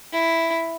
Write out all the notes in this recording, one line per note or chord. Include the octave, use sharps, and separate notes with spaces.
E4